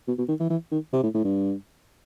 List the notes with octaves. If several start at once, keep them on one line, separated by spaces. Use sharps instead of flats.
B2
B2
D#3
E3
E3
D#3
C3
A2
A2
G2